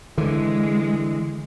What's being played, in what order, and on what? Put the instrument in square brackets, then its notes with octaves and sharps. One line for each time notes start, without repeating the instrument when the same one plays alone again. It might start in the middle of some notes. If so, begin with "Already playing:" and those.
[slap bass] D3 E3 [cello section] G#3